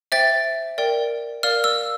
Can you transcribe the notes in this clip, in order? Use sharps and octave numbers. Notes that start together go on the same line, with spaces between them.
C5 E5 G5 A6
A#4 D5 G5
A#4 D5 F5 F6
E6